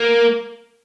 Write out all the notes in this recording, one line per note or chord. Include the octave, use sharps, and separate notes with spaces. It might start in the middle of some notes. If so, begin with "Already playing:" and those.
Already playing: A#3